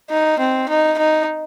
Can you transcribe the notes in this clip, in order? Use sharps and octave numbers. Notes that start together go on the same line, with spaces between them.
D#4
C4
D#4
D#4